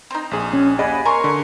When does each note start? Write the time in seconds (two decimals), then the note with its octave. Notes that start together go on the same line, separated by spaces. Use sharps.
0.10 C4 D#4
0.31 A#1 G#4
0.53 C#4
0.79 D#2 G#4 D5 D#5 F#5 G#5 B5
1.05 A#4 C#5 G#5 C6 C#6
1.24 D3